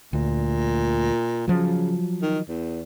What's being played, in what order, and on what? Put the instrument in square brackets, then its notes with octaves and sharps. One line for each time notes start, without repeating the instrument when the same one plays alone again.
[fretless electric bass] D2 [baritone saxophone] A#2
[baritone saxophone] C#3 [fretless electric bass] F3 F#3
[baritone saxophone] D#3
E2